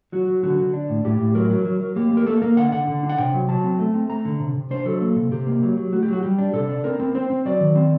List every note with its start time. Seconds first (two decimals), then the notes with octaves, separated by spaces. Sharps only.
0.12 F#3 F#4
0.28 F#3
0.43 D3 F#4
0.59 D3
0.73 D4
0.89 A2
1.04 A2 G4
1.20 A2
1.35 F#3 A#4
1.50 F#3
1.66 F#3
1.81 F#3
1.96 A#3 G4
2.11 A#3
2.17 A#4
2.26 A#3 A4
2.42 A#3 A#4
2.57 D3 F#5
2.72 D3 F#5
2.88 D3
3.03 D4
3.09 F#5
3.18 C3 G5
3.34 F#3
3.49 F#3 A5
3.64 C4
3.79 A3
3.94 C4
4.10 A3 A#5
4.25 D3
4.40 C3
4.55 C3
4.71 D4 C5
4.85 F#3 A4
5.01 A#3
5.16 C3
5.31 C3 G4
5.47 A#3
5.62 F#3
5.77 F#3
5.92 A3 F#4
6.03 G4
6.08 F#3
6.13 F#4
6.23 G3 G4
6.38 D4
6.54 C3 A4
6.69 D4
6.84 C4 A#4
7.00 C4
7.15 C4 C5
7.30 C4
7.45 F#3 D5
7.61 D#3
7.76 C4